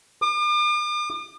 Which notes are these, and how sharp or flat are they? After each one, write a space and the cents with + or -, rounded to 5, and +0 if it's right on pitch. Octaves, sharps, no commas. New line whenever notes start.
D6 +45